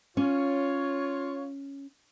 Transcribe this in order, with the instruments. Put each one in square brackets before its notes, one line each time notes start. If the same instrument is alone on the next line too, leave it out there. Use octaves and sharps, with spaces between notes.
[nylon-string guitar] C#4 [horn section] F4 C#5